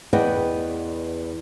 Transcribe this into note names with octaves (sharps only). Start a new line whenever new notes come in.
E2 B4 D5 D#5 F#5 G5